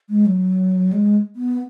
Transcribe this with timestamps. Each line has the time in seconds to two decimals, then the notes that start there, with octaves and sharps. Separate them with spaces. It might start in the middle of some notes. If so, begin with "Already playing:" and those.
0.09 G#3
0.26 F#3
0.93 G#3
1.36 B3